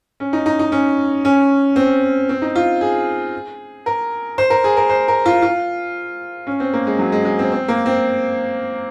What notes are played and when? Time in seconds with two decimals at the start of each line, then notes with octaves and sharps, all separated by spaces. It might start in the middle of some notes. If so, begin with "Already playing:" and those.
0.20 C#4
0.33 D#4
0.46 D#4
0.59 D#4
0.72 C#4
1.25 C#4
1.76 C4
2.29 C4
2.42 D#4
2.55 F4
2.81 G#4
3.86 A#4
4.38 C5
4.50 A#4
4.64 G#4
4.77 A#4
4.90 C5
5.08 A#4
5.26 F4
5.42 F4
6.47 C#4
6.60 C4
6.73 A#3
6.87 G#3
6.99 F#3
7.12 G#3
7.25 G#3
7.39 C4
7.52 C4
7.68 A#3
7.86 C4